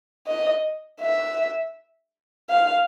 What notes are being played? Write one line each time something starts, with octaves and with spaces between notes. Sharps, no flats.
D#5
E5
F5